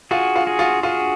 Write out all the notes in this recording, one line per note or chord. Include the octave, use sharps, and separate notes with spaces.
F4 F#4 G#4
F4
F#4 G#4
F4
F4 F#4 G#4